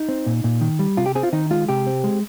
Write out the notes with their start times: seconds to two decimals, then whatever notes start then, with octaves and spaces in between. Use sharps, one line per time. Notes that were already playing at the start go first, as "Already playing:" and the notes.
Already playing: D#4
0.09 C4
0.26 A#2
0.44 A#2
0.61 D#3
0.79 G3
0.97 C3 F4
1.06 G4
1.15 C4 G#4
1.23 F4
1.33 D#3 D#4
1.51 G#3 F4
1.69 C3 G4
1.87 C4
2.04 G#3